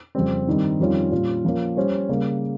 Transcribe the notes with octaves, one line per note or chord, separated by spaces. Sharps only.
F2 C#3 G3 C4
G2 D#3 G3 C4 D#4
F2 D#3 G3 C#4 F4
A#2 G3 C#4 F4
F3 A#3 C#4
G3 C#4 G4 C5
C#3 G3 A#3